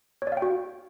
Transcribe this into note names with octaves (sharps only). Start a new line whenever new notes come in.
C#5
D5
F5
G5
F#4